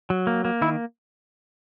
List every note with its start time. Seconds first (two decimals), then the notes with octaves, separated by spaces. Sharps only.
0.10 F#3
0.27 A#3
0.45 A#3
0.62 D#3 E4